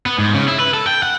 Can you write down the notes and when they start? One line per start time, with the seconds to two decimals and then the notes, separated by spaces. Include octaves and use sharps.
0.06 B3
0.19 G#2
0.34 C#3
0.48 E4
0.60 B4
0.74 A4
0.87 G5
1.03 F#5